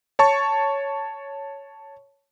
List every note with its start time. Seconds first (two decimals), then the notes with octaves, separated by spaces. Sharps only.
0.19 C#5 A5 C#6